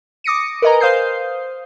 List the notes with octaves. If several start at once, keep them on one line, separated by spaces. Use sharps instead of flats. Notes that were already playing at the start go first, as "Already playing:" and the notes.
D6 D#6 A#6 C#7 D#7
A#4 B4 D#5 G#5 A#5
C5 F5 D#6 G6 C7